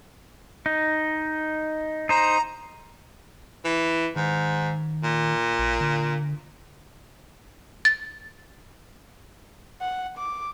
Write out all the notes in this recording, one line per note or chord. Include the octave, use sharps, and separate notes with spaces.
D#4
D#4 C5 A#5
E3
G#2 D#3
A#2
A1
D3
A6
F#5
D6